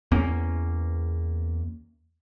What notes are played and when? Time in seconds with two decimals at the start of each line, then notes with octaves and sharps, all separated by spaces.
0.12 E2 A#3 C#4